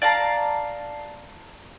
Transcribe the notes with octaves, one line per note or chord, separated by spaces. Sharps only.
D5 F5 A5 A#5